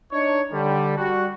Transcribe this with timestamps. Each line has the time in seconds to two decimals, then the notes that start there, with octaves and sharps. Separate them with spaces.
0.12 D4 D#4 C#5
0.53 D3 G3
0.97 G3 F#4